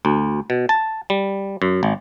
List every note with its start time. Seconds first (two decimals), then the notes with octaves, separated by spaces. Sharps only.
0.05 D2
0.50 B2
0.69 A5
1.10 G3
1.62 F#2
1.83 G#1